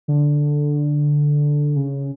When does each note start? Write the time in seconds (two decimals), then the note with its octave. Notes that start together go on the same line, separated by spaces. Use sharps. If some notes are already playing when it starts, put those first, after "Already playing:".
0.08 D3
1.76 C#3